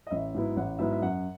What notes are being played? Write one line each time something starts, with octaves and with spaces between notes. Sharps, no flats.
D#5
A1 E5
G#2 F#3 B3 E4
A1 F#5
G#2 F#3 B3 E4 E5
E5
F#2 F#5